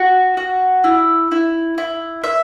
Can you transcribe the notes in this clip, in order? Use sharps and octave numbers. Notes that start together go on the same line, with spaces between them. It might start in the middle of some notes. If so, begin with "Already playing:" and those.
Already playing: F#4
F#4
E4
E4
E4
E5